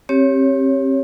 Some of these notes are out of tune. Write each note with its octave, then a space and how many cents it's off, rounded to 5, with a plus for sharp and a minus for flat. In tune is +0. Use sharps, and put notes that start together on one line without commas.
C4 +40 G4 +0 C#5 +0